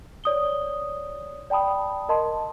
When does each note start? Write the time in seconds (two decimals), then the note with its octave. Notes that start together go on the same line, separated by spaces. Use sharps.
0.24 C#5 D5 D#6 G7
1.50 D5 G5 A5 B5 D#6
2.09 A#4 D#5 A5 C6